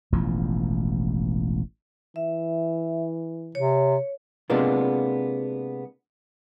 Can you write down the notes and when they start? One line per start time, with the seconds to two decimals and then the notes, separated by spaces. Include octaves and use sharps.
0.12 E1 A1 E2 F3
2.16 E3 E5
3.55 C3 C#5
4.50 C3 G#3 A#3 B3 D4 F4